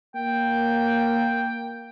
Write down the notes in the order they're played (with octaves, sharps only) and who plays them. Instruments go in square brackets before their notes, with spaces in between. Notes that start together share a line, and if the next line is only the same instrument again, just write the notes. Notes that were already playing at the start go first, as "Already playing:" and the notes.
[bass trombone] A#3 [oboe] G5